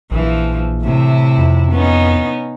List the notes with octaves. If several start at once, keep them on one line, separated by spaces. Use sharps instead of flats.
A#1 E3 F3
A2 C3 E4
F2
B3 C#4 D#4